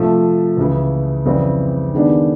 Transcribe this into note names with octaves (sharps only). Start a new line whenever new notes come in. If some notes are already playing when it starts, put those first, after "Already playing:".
Already playing: C3 F3 A3
C#2 C#3 E3
F2 C#3 E3 G3 C4
D#3 G#3 B3 D4 G4